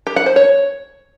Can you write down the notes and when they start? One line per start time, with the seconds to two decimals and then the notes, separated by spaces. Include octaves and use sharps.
0.07 G4
0.16 F#5
0.26 C5
0.36 C#5